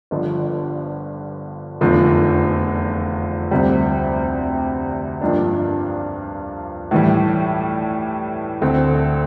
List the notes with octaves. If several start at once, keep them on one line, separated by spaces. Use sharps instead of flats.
G1 G2 D3 F3
F1 E2 D3 F3
D2 C3 G3
G2 F3 A#3 D4
A2 E3 G3
D2 D3 A3 C4